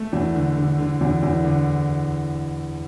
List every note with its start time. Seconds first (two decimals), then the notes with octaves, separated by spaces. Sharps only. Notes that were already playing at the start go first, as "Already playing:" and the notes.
Already playing: A3
0.13 E2
0.35 D3
0.57 D3
0.79 D3
1.01 E2
1.22 E2
1.44 D3